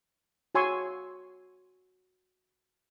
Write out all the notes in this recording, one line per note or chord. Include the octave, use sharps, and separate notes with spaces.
F#4 C#5 G#5 C6 C#6 E6